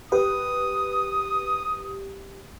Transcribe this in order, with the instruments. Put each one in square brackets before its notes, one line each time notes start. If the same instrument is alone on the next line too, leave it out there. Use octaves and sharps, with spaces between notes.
[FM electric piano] G4 [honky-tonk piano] B4 [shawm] D#6